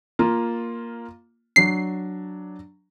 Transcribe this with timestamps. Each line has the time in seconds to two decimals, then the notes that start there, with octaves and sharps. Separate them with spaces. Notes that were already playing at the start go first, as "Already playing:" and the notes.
0.19 A#3 F4
1.56 F#3 D4 C7